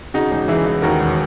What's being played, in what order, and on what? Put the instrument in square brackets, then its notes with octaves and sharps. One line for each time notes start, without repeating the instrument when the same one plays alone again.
[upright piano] C#3 D#4 F#4
E1
E3 E4 G#4
E3
D#2 F#4 A#4
E1